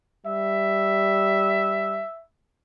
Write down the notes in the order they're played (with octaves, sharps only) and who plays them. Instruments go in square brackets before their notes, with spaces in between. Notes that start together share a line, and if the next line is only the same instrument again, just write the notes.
[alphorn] G3 [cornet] E5